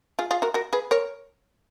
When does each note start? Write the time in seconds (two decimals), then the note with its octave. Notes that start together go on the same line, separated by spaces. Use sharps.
0.19 F4 G#4
0.31 F4 G#4
0.42 F#4 A#4
0.54 F#4 A#4
0.73 G#4 B4
0.91 A#4 C#5